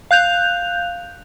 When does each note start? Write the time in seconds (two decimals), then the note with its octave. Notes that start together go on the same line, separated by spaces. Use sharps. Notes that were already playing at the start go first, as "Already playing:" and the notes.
0.11 F5 F#6 G6 F7